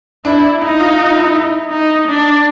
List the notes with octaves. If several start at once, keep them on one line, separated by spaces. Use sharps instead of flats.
D4 E4
D#4 E4
F4
F4
E4
E4
D#4
D4